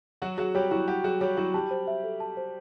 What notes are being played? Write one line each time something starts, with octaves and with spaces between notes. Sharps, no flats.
F#3 F#4 F#5
F#3 F#4 G#4
G3 G4 C#5
F#3 E4 F#4
G3 G4 F#5
F#3 F#4 G#4
G3 G4 C#5
F#3 E4 F#4
G3 G4 A5
C5
E5
A4
A5
C5